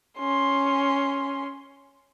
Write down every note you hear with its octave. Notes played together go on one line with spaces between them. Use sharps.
C#4 C6